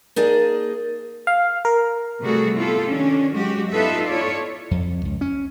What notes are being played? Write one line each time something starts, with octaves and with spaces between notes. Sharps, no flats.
A#3 D#4 G#4 D5 D#5 A5
F5
A#4
C3 G3 A3 F#4 G#4 A4
B3 E4 F4 G4 A4
D#3 C#4 D4
F#3 G#3 F#4 G4
B3 D#4 F4 A4 B4 E5
E4 F4 A4 C#5 D5
F2
C#2
C#4